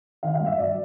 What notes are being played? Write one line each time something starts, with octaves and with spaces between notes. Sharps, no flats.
D#3 F5
F5
G2
E5
F#3 D5